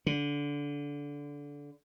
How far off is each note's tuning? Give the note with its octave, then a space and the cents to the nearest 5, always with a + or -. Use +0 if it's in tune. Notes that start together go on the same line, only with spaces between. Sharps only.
D3 -20